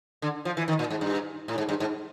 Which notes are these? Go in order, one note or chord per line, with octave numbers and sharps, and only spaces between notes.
D3
F3
E3
D#3
A#2
G#2
G2
A2
G#2
G2
G#2